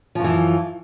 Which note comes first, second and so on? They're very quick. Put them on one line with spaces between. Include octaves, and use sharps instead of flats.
F3 F#2 E3